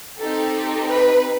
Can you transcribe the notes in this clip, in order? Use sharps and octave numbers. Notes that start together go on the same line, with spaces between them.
C4 D#4 G4 A4
B4